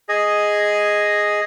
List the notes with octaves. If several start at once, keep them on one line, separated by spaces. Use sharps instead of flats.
G#4 D#5